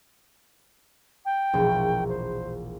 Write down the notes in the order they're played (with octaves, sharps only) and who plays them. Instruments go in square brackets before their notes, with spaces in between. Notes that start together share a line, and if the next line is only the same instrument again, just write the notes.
[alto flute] G5
[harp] E1 A#1
[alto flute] C5